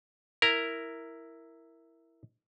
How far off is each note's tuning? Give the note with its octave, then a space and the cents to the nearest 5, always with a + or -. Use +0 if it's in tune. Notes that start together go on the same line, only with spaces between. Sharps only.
E4 +0 A#4 -5 A#5 +0